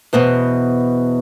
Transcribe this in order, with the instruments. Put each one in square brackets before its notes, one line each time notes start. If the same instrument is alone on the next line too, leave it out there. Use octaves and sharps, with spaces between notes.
[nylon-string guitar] E2 B2 B3 C5